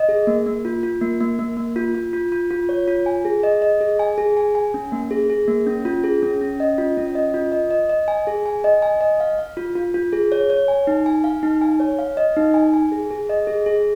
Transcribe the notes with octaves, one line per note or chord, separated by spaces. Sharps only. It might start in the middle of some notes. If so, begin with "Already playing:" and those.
Already playing: D#5
G#4
A#3
A#3
F4
F4
A#3
A#3
A#3
A#3
F4
F4
F4
F4
F4
C#5
F4
G#5
G#4
D#5
D#5
G#4
G#5
G#4
G#5
G#5
C#4
A#3
G#4
G#4
A#3
C#4
F4
G#4
C#4
C#4
D#5
F4
C#4
D#5
F4
D#5
D#5
D#5
G#5
G#4
G#5
D#5
G#5
D#5
F5
F5
F4
F4
F4
G#4
C#5
C#5
G#5
D#4
G#5
F5
D#4
G#5
C#5
F5
D#5
D#4
G#5
G#5
G#4
G#4
D#5
G#4
G#4